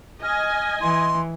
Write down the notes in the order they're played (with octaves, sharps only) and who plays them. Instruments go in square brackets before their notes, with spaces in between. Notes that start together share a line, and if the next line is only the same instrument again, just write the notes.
[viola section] D#5 G#5 [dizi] F6
[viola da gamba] E3 [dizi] C6